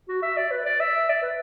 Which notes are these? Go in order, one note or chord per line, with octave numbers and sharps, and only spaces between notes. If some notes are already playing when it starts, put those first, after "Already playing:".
F#4
E5
D5
B4
D5
E5
D5
B4